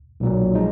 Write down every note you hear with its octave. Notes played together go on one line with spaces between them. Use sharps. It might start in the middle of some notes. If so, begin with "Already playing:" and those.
B1 A#2 F#3
F3 G#3 D#4